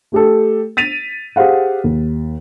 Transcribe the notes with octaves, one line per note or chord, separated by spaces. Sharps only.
A3 G4 A4
A6 B6 D#7 F7
G4 G#4 C5 F5 F#5
D#2